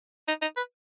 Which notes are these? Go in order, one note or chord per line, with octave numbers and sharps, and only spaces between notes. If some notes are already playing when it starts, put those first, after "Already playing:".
D#4
D#4
B4